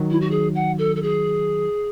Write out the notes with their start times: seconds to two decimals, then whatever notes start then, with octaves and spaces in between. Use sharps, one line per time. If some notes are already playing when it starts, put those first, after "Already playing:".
Already playing: D#3 F#3
0.10 E4
0.20 F#4
0.31 G#4
0.54 F#5
0.78 A4
0.96 A4
1.02 G#4